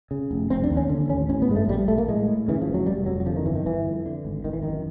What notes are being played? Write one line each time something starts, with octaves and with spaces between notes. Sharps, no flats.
C#3
F1
F1 C4
D4
D#2
C#4
D3
A1 C#4
A1 C#4
B3
G2 G#3
A3
A#1 G3
A#1 A3
A#3
A2 G#3
A2
C#3 E3
F3
F1
F#3
F1 G3
F2 F#3
F#3
D3 F3
D#3
G1 E3
D#3
G1 E3
F2
D3
G#1
G#1 D#3
E3
F#2 D#3